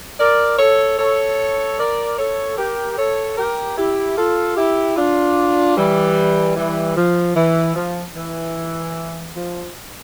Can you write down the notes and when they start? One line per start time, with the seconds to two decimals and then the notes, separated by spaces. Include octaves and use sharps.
0.20 A#4 D5
0.59 A4 C#5
0.99 A4 C#5
1.78 A#4 D5
2.18 A4 C#5
2.57 G4 A#4
2.97 A4 C#5
3.37 G4 A#4
3.77 E4 G4
4.17 F4 A4
4.57 E4 G4
4.96 D4 F4
5.77 E3 G3
6.56 E3 G3
6.96 F3
7.35 E3
7.75 F3
8.16 E3
9.36 F3